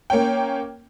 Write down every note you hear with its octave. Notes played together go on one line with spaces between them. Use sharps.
A#3 C#4 G5